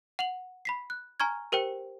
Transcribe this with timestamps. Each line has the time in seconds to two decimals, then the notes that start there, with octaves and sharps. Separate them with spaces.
0.19 F#5 F7 F#7
0.65 B5 B6 C7
0.90 F#6
1.20 G#5 A#5 C#6 F6 G#6
1.52 G4 A#4 C5 G5 C#7